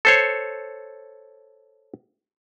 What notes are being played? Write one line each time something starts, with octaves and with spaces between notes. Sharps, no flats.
A4 C5 C#5